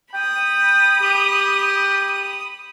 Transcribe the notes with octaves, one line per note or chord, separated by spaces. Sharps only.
G5 B5 D#6
G4